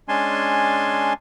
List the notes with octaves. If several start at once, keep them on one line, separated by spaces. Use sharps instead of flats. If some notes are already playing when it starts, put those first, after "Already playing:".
G#3 C#4 D4 G#5 A5 C6